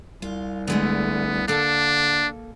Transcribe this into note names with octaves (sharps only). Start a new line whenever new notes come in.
C2 F4
D3 G#3 A3 B3
D3 A#3 D4 A4 A5